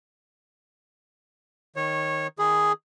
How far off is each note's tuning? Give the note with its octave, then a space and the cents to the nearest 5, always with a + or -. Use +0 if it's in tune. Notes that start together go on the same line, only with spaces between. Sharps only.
D#3 +0 C#5 -20
D#3 +10 G#4 +0 B5 +0